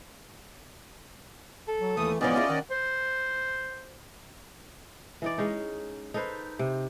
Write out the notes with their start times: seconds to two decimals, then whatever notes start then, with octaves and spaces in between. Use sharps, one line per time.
1.68 A4
1.80 F#3
1.97 D#2 E3 A3 D#6
2.21 G#2 E3 F3 B3 C#4 D5 D#5
2.36 E4 F4 G#4
2.49 D#3 A#3 F#5
2.71 C5
5.22 E3 D#4 D5
5.38 G#3 C#4 D#4
6.14 D#4 A4 B4 C5
6.59 C3